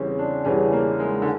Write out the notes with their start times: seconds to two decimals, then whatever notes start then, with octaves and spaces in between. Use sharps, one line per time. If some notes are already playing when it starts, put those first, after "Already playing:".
Already playing: E2 C#3 E3 G3 C4 C#4
0.19 D4
0.45 E2 C#3 E3 G3 C#4
0.73 A#3
1.00 G#3
1.22 D3